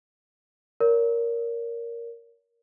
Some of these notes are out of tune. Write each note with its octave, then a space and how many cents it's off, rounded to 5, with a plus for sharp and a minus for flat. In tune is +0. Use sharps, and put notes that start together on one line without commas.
A#4 +0 C#5 +40